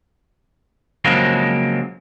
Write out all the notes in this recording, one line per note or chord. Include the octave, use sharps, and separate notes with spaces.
C#3 F3 F#3 G#3 A#3 C4